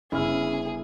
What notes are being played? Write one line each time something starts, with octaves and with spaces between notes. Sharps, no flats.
G1 C#3 C#4 E4 G#4 F6